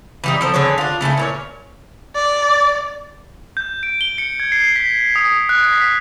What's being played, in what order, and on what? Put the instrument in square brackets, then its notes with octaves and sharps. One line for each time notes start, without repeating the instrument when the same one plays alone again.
[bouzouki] E3 G3 D#4
F3 A4 C5
D3 G#4 B4 C#5
D4 F4
C#3 A3 E4 G#5
A#2 C#4 C#5
[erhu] D5
[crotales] G6
D7
G7
C#7
G#6
C7
B6
D#6
F#6
B6